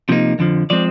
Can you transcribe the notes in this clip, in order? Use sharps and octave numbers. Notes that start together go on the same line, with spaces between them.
C3 F3 A#3 D#4
F2 D3 F3
F3 G#3 C4 D5